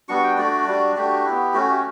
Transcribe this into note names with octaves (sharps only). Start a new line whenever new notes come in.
G3 B3 D4 F#4 C#6
G5
A3 D4 F#4 D5
G3 D4 F#4
A3 D4 F#4 G4
B3 E4
A3 C#4 F#4
G4